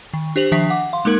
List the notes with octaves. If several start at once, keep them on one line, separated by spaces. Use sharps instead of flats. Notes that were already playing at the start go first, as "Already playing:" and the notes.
D#3
D4 G4 C5 F7 F#7
D#3 F3 D4 E5 B6
F#5 D6
F5 C6
G#3 A#3 D#4 A#4 G#6 F#7